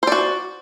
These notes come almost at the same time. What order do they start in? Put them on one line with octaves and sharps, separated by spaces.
C5 D5 F#4